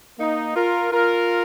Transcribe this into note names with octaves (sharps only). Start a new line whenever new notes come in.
A#3 D#4
F4 A#4
F4 A#4